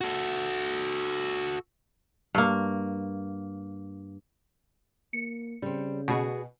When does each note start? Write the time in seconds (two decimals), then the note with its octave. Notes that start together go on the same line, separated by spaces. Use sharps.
0.01 F#4 A4
2.35 G2 A#3
5.13 A#3 C#7
5.62 C#3 G3 C4
6.08 B2 B3 F#4 G#4